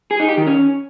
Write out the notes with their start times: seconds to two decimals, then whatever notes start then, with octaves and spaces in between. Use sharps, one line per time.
0.11 G#4
0.20 D#4
0.29 G4
0.38 D#3
0.46 C#4